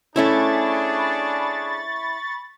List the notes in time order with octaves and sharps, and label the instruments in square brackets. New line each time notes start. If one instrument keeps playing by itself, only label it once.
[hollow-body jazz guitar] A3 C#4 E4 [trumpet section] D4 G#4 [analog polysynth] B5 C#6 A6